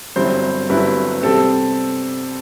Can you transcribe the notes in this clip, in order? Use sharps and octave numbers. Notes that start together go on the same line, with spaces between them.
G1 G2 F#3 C4 E4 C5
G1 G2 F#3 C4 E4 B4
C3 G3 C4 A4